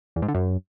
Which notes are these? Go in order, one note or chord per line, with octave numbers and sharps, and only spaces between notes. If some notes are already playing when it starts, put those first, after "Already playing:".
E2
G#2
D3
F#2